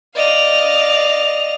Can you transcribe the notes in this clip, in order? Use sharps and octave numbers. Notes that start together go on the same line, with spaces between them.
D5 D#5 F5 F7